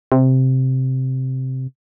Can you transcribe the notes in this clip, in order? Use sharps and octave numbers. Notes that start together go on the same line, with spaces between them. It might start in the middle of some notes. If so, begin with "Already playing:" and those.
C3